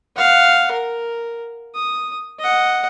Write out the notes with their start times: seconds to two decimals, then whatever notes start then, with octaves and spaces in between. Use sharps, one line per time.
0.16 F5 F#5
0.71 A#4
1.75 D#6
2.39 D#5 F#5